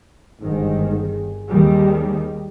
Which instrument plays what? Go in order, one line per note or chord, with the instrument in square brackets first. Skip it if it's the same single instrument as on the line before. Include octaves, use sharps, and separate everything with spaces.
[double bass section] G1 D#3 [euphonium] G#2
[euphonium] G#4
[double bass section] D#2 D#3 G3